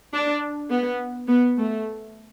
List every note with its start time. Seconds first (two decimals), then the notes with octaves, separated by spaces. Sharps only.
0.13 D4
0.70 B3
1.28 B3
1.57 A3